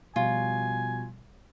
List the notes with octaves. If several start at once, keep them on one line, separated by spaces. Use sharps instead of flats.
B2 F3 G3 F4 G#5